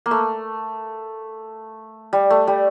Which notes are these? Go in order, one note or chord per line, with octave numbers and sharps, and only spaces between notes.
A#3
A3
G3
A3
G3